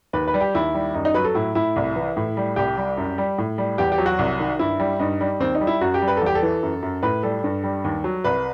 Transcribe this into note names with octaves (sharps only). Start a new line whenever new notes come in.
D#2 B4
B4
G3
G4
D#2 E4
G3
F#2 D#4
D#4
F#3 B4
A4
A2 E4
A2 E4
C2
E3
A2
G3
C2 G4
G3
F#2
G3
A2
G3
E2 G4
G4
F#3
F#4
C2
D#3
G2 E4
G3
G2 D#4
G3
D#2 C4
D#4
G3
E4
F#2 F#4
G4
G3
B4
A4
E2 G4
A4
E3
F#2
F#2
A2 B4
G3 A4
G2
G3
D#2
F#3
C2 B4